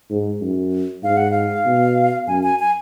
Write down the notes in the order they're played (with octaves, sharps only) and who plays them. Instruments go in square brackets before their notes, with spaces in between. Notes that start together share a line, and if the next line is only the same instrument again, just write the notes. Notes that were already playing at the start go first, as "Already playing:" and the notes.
[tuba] G#2
F#2
[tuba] G#2 [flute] F5
[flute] F#5
F5
[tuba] B2
[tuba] F#2 [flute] G#5
[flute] G#5
G#5